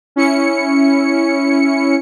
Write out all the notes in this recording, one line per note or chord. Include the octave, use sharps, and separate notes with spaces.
C#4 E4 C#7